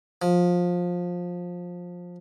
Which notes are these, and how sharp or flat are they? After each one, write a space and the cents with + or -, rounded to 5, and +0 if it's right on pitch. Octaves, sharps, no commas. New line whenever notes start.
F3 +20